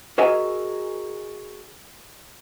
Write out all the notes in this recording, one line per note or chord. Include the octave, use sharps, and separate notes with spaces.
F#4 G#4 A#4 D#5 E5 G#5